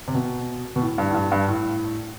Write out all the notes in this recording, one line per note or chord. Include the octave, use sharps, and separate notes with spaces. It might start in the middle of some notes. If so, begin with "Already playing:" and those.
C3
B2
B2
A2
G2
A2
G2
G2
A2